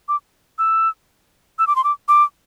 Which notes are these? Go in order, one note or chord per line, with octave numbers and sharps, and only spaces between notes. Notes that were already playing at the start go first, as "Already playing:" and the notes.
D6
E6
E6
D6
C6
D6
D6